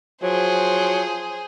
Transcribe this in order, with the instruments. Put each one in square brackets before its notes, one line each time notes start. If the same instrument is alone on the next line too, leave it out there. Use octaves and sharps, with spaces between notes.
[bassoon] F3 [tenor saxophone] F#3 [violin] G#4 C5